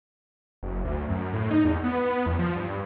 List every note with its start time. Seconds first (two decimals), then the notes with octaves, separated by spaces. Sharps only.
0.63 F#1
0.85 D2
1.08 F#2
1.33 A2
1.51 D#4
1.65 E2
1.84 B3
2.26 E2
2.39 F3
2.56 G2